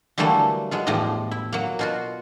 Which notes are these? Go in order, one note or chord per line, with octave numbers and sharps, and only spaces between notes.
D3 E3 F#3 G3 A3 A#3
F#3 G#3 F4
E2 A2 F3 G4 D#5
E4
F#3 A#3
B2 F4 F#4